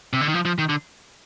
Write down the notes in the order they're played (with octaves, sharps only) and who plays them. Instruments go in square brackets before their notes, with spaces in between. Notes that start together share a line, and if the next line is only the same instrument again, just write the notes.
[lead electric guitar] C3
D3
D#3
F3
F3
D#3
D3